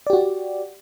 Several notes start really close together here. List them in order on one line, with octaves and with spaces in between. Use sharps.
D5 G4 F#4